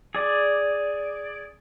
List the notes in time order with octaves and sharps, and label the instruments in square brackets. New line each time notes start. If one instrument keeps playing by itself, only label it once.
[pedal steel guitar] G#4 D5